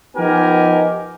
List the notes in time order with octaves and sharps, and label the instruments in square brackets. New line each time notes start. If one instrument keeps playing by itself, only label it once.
[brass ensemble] F3 B3 D#4 G4 A#4 G#5